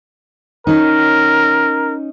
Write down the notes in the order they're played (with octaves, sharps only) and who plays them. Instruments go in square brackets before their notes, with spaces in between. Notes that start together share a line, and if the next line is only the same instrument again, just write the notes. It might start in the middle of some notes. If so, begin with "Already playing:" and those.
[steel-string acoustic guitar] C#4 D#4 [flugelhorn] A#4